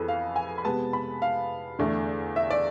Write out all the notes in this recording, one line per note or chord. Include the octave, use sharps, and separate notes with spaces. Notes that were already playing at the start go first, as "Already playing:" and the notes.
Already playing: F2 E3 B3 E4 G#4 A4 B4
F5
G#5
B5
C3 G#3 B3 A5
B5
F5
E2 D3 A3
E5
D5